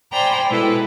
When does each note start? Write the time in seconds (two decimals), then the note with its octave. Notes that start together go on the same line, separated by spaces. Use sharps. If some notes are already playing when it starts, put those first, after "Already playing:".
0.12 C5 D5 G5 G#5 A#5 B5
0.49 B2 G#3 E4 A4 B4